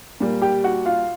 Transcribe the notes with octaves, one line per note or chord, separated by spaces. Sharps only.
A#2 G3 A#3
G4 G5
F#4 F#5
F4 F5